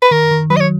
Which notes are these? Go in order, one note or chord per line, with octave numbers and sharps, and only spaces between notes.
B4
D#3 A#4
D#3
F#3 B4
D#5
C#5